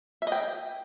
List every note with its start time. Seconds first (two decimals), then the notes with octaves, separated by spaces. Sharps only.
0.22 E5
0.27 D#5
0.32 G5